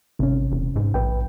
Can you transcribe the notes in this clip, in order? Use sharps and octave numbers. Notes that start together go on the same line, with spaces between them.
G#1 C3 C#4
E1
G#2
A#1 B4 G5